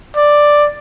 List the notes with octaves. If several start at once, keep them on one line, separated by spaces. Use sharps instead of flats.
D5